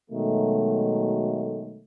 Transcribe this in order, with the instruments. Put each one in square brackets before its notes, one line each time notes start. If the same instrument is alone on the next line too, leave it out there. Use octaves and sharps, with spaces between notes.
[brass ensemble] B2 D#3 F#3 G#3 A3